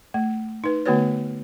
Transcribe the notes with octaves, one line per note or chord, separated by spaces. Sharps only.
A3
D#4 B4
D3 A3 B3 F#4 B4 C#5